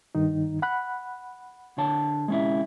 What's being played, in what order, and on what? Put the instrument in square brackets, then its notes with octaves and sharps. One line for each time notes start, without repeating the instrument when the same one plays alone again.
[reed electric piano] G2 D#3 D#4
F#5 B5 F#6
[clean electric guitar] D3 C#5 A5
G#3 C#4 E4